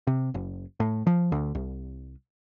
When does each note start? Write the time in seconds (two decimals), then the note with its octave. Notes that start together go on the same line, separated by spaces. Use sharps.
0.07 C3
0.34 F#1
0.80 A2
1.07 F3
1.32 D2
1.55 C2